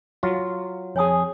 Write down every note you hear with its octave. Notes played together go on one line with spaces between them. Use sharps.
F#3 F4 F5
F2 G#4 C#5 G#5 D#6